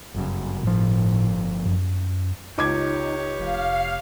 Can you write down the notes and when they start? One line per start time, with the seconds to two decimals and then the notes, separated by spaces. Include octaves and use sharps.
0.14 G1 F#2 C#3
0.63 G1 A2 F3
1.66 F#2
2.58 C#2 D#4 G4 C#5 D6 G#6
3.39 F1 F5